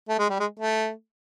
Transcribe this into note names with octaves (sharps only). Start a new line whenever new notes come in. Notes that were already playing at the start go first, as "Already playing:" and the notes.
A3
G#3
G3
G#3
A3